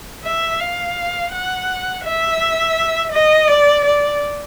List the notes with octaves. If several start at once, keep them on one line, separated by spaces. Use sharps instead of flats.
E5
F5
F#5
E5
D#5
D5
D5